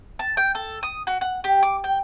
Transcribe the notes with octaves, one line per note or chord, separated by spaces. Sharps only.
A5
G5
A4
D#6
F#4
F#5
G4
D6
G5